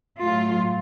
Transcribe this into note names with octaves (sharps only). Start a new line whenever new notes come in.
A2 F#3 A3 F4